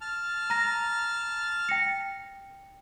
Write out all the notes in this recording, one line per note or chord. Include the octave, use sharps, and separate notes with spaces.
A5 F6
A#5 A#6
G5 A#6 C#7